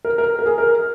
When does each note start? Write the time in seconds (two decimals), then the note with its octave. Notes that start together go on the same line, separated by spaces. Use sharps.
0.05 A#4
0.18 A#4
0.39 A#4
0.46 G#4
0.58 A#4